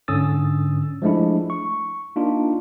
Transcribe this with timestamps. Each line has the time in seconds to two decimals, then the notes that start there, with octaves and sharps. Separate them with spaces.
0.08 G#2 D3 C#4 D#6 E6 A6
1.02 F3 G#3 A3 D4 E4
1.50 C#6
2.16 A#3 D4 D#4 F4